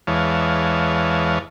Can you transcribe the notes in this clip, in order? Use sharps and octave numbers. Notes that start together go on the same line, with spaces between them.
E2 E3 G#3 C#5 F5 A5